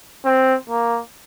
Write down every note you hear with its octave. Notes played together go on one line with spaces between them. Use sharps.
C4
A#3